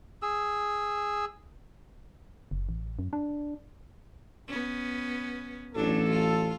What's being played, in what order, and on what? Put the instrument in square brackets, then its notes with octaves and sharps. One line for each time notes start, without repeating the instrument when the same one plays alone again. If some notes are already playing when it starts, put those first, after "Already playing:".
[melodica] G#4 E6
[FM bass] F#1
A1
F#2
D4
[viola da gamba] B3 C#4
[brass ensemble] A1 A4 [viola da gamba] F#3 D4
[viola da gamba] F4